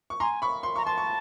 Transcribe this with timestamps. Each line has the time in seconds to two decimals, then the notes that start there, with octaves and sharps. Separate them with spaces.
0.10 C#6
0.20 G#5 A#5 C6
0.42 B5 C#6
0.63 C6
0.76 A#5 C#6
0.85 A5 C6
0.98 C#6